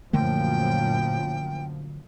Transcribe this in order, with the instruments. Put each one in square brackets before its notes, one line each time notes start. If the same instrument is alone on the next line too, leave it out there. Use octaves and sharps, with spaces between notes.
[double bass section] F#2 A#2 F3 [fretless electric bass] D3 A3 A#3 [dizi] G5